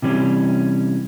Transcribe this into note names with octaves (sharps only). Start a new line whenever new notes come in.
C3 E3 G3 C#4